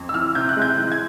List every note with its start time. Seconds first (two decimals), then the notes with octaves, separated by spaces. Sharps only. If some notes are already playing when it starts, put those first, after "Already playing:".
Already playing: F2
0.09 E6
0.14 E3 F6
0.35 C3 G6
0.49 F#6
0.57 G#3
0.62 G6
0.78 E3
0.92 G#6